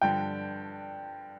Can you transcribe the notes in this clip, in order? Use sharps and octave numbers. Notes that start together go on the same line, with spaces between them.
G2 D3 F3 G5